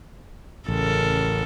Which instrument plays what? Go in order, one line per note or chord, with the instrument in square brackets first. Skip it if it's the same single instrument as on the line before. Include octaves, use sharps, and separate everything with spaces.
[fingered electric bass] A1 [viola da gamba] C#3 A4 A#4